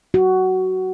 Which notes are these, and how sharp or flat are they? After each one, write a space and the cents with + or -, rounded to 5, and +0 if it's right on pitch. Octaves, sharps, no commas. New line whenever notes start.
F#4 +15